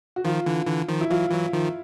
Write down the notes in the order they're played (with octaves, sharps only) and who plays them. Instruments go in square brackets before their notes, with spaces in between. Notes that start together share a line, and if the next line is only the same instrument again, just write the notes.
[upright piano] F#4
[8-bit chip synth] D#3 F3 [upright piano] F4
[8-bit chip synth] D3 E3
D3 E3
D#3 F3
[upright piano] E4
[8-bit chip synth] E3 F#3 [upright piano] F4
[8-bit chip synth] E3 F#3
D#3 F3